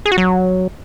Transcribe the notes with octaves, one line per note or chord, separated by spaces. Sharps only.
G#4
F#4
F#3